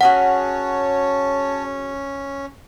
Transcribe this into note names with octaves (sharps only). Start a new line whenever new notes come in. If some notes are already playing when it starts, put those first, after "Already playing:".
C#4 F#4 G#4 A#4 C#5 F#5 A5